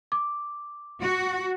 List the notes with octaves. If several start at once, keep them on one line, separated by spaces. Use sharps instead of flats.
D6
F#4